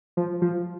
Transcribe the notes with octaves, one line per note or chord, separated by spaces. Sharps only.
F3
F3